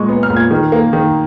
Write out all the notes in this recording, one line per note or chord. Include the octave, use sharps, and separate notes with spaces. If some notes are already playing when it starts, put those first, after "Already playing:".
Already playing: A#2 G#3 D#5 C#6
B3
F6
A#2
G#6
D#3
A#3
D#3